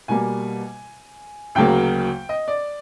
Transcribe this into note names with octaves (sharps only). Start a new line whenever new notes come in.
B2 G3 A#3 G#5
D2 C#3 F#3 A#3 G5
D#5
D5